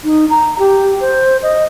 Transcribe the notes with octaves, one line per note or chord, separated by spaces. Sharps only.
D#4
A#5
G4
C5
D#5